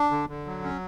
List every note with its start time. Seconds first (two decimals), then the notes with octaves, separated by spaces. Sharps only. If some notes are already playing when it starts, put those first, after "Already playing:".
Already playing: D4
0.11 D3
0.29 D3
0.46 F#3
0.64 C#4